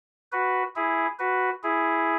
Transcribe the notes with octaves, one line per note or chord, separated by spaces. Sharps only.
F#4 B4
E4 G#4
F#4 B4
E4 G#4